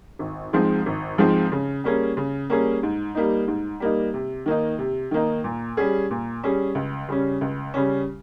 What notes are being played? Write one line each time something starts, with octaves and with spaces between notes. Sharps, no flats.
G#1
G#2 F3 G#3 C4
G#1
G#2 F3 G#3 C4
C#3
G3 A#3 C#4 G#4
C#3
G3 A#3 C#4 G#4
G#2
G3 A#3 D#4
G#2
G3 A#3 D#4
C3
D#3 A#3 D#4
C3
D#3 A#3 D#4
A#2
G3 C#4 G#4
A#2
G3 C#4 G#4
C#2
C#3 G3 C#4
C#2
C#3 G3 C#4